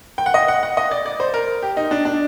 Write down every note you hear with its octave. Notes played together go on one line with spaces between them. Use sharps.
G5
F#5
D#5
F#5
F#5
D#5
D5
D5
C5
A#4
G4
D#4
D4
D4